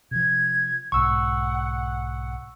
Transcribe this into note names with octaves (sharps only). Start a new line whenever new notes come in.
C3 F3 G#6
B1 G#2 F#5 C#6 E6